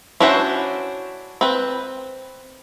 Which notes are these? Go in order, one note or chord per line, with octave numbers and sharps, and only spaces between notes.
C#4 D4 E4 F#4 C5
C4 B4